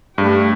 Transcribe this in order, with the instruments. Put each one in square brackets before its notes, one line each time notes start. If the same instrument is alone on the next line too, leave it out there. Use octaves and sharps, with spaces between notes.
[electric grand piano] G2 [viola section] A3 D4 G4